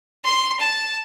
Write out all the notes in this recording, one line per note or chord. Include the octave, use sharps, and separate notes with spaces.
C6
A5